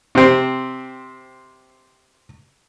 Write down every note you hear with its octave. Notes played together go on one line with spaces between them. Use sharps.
C3 C4